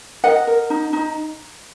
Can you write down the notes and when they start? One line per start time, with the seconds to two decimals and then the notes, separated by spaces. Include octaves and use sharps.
0.24 A#4 D#5 F#5
0.47 A#4
0.70 D#4
0.93 D#4